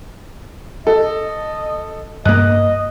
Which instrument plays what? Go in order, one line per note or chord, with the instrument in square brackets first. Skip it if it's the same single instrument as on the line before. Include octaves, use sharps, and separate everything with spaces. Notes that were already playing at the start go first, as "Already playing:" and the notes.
[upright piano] A4 [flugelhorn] D#5
[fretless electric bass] G2 A#3 [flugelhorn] D#5 [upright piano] F#6